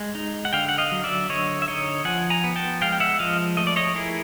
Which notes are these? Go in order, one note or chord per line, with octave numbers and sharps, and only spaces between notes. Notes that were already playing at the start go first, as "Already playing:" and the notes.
Already playing: G#3
D#4
F#5
D3 F5 G5
F#5
D#5 F5
F#3
D5 E5
D3 C#5 D#5
E5
D#4 C#5 D#5
F3 F#5 G#5
G#5 A#5
B3
G5 A5
G#3 F5 G5
G5
E5 F#5
F3 D#5 F5
A3 D#5
D5
C#5 D#5
E4 G#4 A#4